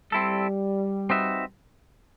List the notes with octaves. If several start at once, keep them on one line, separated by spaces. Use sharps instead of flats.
G3 C4 E4 A4
C4 D#4 F#4 B4 E5